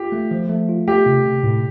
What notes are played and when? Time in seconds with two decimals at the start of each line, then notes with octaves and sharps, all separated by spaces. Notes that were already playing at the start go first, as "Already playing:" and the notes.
Already playing: F4 G4
0.12 A3
0.31 F3
0.49 A3
0.69 F4
0.87 A3 G4
1.06 C3
1.25 C3
1.43 A2